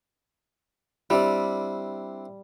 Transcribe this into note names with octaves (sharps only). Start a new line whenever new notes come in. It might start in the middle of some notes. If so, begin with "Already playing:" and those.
G3 C4 D4 E4